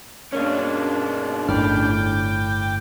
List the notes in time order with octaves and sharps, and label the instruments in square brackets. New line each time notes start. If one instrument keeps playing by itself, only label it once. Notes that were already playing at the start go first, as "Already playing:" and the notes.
[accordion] G2 B2 G#3 [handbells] A#3 A#4 C#5 [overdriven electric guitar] C#4 D4
[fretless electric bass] G1 A2 [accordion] G5 D6 [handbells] B5 F6